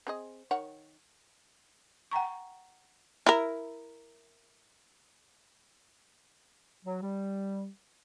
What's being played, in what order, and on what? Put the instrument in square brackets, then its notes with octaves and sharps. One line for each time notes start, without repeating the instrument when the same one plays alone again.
[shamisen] C4 G#4 D#5
D#3 C#5 F#5
[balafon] F#5 G5 A#5 C#6
[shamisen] E4 A#4
[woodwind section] F#3
G3